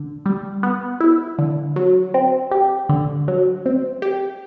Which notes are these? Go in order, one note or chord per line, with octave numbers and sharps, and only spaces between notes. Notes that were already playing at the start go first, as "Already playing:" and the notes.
Already playing: D3
G3
B3
E4
D3
F#3
C4
G4
D3
F#3
C4
G4